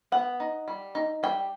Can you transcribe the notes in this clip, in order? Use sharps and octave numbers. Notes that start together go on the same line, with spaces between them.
B3 F#5
D#4
G3
D#4
G3 G5